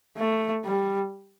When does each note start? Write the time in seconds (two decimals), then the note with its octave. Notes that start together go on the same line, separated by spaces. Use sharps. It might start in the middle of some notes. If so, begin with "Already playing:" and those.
0.17 A3
0.64 G3